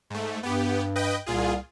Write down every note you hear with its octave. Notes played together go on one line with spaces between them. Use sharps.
G#2 A3
G2 B3 G4
B4 D#5 G5
C2 A#2 F4 G#4